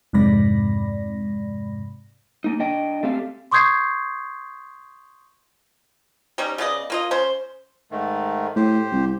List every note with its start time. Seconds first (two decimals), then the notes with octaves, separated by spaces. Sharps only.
0.13 F2 G#2 C3 D5 B5 A#6
2.44 A#3 D#4
2.59 D4 D#5 G5
3.03 A3 C4 G4 F5
3.51 C6 C#6 D#6 G6 G#6 C7
6.38 G3 C#4 D#4
6.58 C#3 B3 D5 D#5
6.90 A#3 F4 D#5
7.11 C#4 C5
7.91 G#2 D#3 A3
8.56 A2 G4 C5
8.92 C2